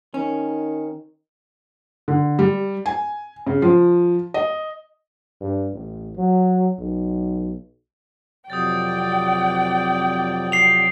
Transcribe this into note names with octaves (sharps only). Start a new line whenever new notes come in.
D#3 C#4
D3
G3
G#5
C#3
F3
D#5
G2
A1
F#3
B1
F2 C3 F#3 D5 G5 D#6 G6 A6
C7 F7 G7